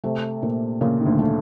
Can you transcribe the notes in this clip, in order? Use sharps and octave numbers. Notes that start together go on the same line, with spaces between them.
C3 A3
A#2
A#2 C#3
D#3
D2 D3
A3